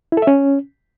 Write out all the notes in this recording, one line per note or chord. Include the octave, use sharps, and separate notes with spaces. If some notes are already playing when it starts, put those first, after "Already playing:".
E4
A4
E5
C#4